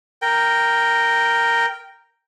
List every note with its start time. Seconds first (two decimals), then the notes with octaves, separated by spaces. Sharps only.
0.22 A#4 G5